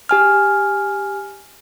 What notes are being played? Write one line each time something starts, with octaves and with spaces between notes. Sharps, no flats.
G4 G#5 F6